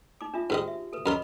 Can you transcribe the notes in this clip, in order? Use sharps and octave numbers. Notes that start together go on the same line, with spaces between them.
D#4 D6
D4 F4 E5
G#2 D#3 F#4 G4 D#5
E5
A4 B4
F#2 A#4 B4 D#5 B5 C6